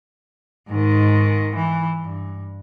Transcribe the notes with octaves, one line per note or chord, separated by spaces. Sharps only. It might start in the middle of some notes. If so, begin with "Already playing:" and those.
G#2 D#3
E3
G2